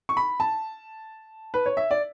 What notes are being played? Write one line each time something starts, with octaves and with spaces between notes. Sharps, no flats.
C#6
B5
A5
B4
C#5
E5
D5